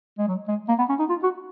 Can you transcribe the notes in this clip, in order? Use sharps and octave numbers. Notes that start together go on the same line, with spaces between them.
G#3
F#3
G#3
A#3
B3
C#4
D#4
F4
F#4